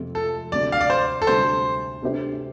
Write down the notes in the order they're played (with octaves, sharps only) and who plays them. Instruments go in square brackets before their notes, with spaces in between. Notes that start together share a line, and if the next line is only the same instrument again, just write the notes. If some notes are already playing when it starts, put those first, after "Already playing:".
Already playing: [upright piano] F2 C3 A3 C4
[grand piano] A4
[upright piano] D2 C3 A3 [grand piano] D5
[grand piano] F5
D5
C5
A4
[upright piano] D2 C3 G3 [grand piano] C5
[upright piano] C3 A3 D4 G4 C5